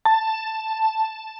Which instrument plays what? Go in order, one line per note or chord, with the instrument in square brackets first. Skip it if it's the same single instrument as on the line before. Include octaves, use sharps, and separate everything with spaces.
[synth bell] A5